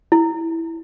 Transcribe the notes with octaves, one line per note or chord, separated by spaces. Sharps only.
E4